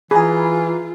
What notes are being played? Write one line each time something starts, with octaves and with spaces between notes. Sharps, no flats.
E3 F4 G#4 G#5 A#5 B5